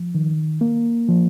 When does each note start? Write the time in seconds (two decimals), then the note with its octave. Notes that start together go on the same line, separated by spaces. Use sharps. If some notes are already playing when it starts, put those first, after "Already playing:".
Already playing: F3
0.15 D#3
0.61 A#3
1.09 F3